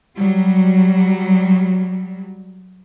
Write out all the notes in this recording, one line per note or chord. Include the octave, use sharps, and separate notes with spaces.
F#3 G3